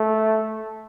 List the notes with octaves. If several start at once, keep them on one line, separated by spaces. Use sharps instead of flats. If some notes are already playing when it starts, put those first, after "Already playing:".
Already playing: A3